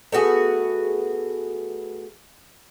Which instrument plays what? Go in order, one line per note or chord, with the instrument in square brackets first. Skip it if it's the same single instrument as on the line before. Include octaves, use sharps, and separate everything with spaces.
[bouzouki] A3 B3 F#4 G#4